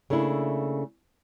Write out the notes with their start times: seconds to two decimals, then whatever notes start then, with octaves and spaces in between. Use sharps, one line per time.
0.10 C#3 A3 A#3 D4 E4